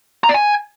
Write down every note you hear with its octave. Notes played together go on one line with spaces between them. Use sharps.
A#5
D5
G#5